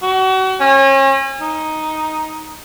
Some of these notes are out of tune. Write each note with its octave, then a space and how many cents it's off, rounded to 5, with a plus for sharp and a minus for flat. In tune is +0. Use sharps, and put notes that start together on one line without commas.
F#4 +35
C#4 -35
D#4 +5